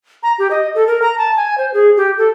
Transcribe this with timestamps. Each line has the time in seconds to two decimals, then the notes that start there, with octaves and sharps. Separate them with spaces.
0.23 A#5
0.39 G4
0.51 D#5
0.75 A4
0.87 A#4
1.02 A#5
1.18 A5
1.36 G#5
1.58 C5
1.74 G#4
1.97 G4
2.18 A4